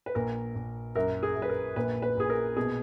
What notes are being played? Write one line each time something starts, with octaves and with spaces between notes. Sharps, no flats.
B4
A#1 A#4
A#1
F#2 A#4
G#4
F#2
B4
A#4
A#1 B4
B4
A#1 G#4
A#4
B2 G#4